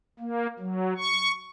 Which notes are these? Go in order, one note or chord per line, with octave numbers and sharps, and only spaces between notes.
A#3
F#3
C#6